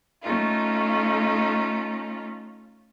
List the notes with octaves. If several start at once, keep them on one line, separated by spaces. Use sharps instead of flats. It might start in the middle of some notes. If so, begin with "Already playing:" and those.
A3 C#4 D#4 F4